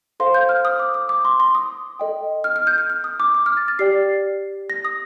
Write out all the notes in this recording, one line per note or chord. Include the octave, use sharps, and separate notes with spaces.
A4 C5 F5 C6
G6
F6
D#6
D6
D#6
D6
C6
C6
D#6
A4 D#5 G5
F6
F6
G6
G6
F6
D#6
D6
D6
F6
A6
A6
G4 D5 G5 C7
A#6
D#6